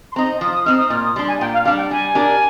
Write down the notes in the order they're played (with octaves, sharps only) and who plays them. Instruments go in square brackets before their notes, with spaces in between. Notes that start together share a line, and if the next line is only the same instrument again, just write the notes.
[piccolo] C6
[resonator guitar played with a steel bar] C4 D#4 [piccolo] A#5
[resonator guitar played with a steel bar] F3 [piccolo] D#6
[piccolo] D#6
[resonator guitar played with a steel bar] C4 D#4 [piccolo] F6
[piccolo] D#6
[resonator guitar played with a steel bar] A#2 [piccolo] F6
[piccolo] D#6
[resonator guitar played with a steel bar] G3 D4 [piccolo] C6
[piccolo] G#5
[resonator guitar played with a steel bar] A#2 [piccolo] G5
[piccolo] F5
[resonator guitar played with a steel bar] G3 D4 [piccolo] F5
[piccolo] G5
[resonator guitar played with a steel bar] G3 [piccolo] G#5
[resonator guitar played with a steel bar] D4 G4 A#4